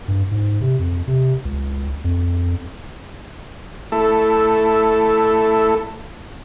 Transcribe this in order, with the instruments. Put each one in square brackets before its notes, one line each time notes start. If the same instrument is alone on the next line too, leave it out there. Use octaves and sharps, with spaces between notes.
[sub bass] G2
G#2
C3
F2
C3
C#2
F2
[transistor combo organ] A3 E4 A4